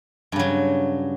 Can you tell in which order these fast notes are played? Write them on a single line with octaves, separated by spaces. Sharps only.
G2 C#3 F#3